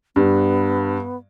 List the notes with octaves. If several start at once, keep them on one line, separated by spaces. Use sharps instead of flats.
G2 B3